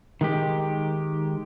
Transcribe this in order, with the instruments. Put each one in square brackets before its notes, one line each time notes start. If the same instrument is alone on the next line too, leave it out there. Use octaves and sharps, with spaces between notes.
[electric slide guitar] D#3 G#3 G4